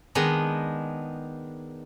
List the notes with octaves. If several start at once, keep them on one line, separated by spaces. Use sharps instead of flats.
D#3 G#3 B3 D4